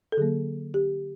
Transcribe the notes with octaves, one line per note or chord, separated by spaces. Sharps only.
A4
D3 F#3 A#3 G#4
G4